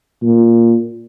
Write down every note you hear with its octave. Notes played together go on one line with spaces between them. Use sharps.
A#2